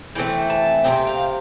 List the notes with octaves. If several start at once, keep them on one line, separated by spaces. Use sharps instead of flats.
E3 A3 C4 G5
A5
C3 G3 C4 G5
F5